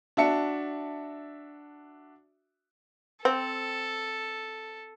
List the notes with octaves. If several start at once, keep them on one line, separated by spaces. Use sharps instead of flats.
D4 F#4 E5 A5 C#7
C4 A4